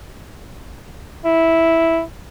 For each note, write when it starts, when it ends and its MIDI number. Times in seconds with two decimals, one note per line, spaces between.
1.25 2.02 64